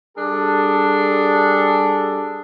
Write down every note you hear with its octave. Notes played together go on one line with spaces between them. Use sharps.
G3 D4 G#4 A4